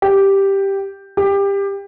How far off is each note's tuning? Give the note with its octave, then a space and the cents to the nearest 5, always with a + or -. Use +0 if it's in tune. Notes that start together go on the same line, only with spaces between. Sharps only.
G4 +0
G4 +20